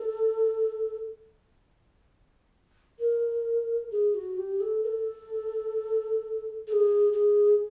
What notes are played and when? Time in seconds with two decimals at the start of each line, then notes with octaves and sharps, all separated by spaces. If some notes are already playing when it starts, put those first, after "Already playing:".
Already playing: A4
2.99 A#4
3.91 G#4
4.14 F#4
4.37 G4
4.60 A4
4.83 A#4
4.87 A4
6.67 A4
6.72 G#4
7.13 G#4